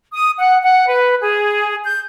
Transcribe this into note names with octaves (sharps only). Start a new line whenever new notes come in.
D#6
F#5
F#5
B4
G#4
G6